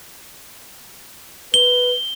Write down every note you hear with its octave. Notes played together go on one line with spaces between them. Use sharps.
B4 G7